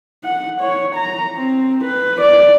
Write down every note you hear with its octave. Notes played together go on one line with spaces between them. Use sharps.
F#5
C#5
A#5
C4
B4
D5